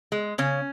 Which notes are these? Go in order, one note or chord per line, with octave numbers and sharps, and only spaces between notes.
G#3
C#3 C#4